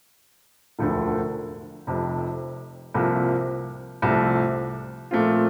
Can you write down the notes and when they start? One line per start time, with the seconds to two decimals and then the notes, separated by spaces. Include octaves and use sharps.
0.79 E1 D2 D3 F3 A3
1.87 F1 F2 C3
2.94 C2 C3 F3 A#3
4.02 C2 C3 F3 A3
5.11 A#2 F3 A3 C4 F4